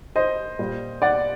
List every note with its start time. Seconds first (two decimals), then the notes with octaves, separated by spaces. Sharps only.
0.16 C5 D#5
0.59 A#2 G3
1.02 D5 F#5